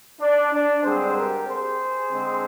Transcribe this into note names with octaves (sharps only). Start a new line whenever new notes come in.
D4
D4
G2 D3 G#3 C4 G#4 C5
G4 A#4
G#4 C5
D3 G#3 C4